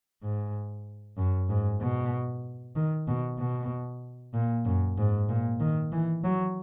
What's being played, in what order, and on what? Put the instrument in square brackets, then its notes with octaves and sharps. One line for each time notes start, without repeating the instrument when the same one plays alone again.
[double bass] G#2
F#2
G#2
B2
D#3
B2
B2
A#2
F#2
G#2
A#2
D#3
E3
F#3